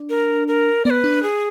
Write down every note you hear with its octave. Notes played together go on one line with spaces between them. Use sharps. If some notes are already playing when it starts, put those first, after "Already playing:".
Already playing: D4
A#4
A#4
B3 B4 D5
D4
G#4